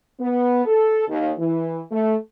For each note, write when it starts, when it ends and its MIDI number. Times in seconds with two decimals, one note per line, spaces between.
0.19 0.64 59
0.66 1.07 69
1.08 1.31 39
1.38 1.80 52
1.91 2.14 57